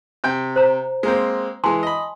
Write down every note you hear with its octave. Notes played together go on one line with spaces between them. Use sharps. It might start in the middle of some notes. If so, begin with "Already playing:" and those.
C3 G5
C5 A#5
G#3 A#3 C4
E3 G#3 G#5 A5 C6
D#5 B5